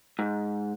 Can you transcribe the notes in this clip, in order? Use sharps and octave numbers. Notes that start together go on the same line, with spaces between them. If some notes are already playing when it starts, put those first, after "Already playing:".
G#2